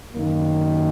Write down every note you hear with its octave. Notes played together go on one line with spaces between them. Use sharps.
F#2 D#3 F#3 A#3